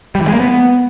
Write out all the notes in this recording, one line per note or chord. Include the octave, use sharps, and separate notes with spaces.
G3
E3
G#3
A#3
B3